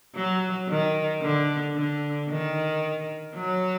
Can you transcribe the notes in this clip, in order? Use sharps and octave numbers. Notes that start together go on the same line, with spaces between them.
F#3
D#3
D3
D3
D#3
F#3